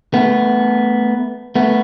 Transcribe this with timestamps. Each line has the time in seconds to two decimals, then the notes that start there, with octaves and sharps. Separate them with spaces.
0.14 A3 B3
1.56 A3 B3